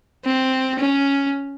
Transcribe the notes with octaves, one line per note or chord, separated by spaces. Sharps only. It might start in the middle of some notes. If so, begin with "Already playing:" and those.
C4
C#4